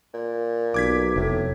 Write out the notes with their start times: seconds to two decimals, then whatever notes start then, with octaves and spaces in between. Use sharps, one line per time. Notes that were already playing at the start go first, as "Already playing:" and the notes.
0.14 A#2
0.74 B1 D6 G#6 B6
1.16 F1 A2